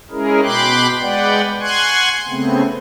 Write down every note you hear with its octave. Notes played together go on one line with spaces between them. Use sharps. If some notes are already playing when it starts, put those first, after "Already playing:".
G#3 C#4 E4 G#4 A#4
B2 G5 B5 C6 D6 F#6
G#3 B4 D5 F#5 G5
F#5 G#5 C6 C#6 F#6 G#6
C#3 A3 B3 C4